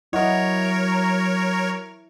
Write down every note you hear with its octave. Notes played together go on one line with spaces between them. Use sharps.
F#3 E4 A#4 C#5 D#5 F#5 C#6
A#5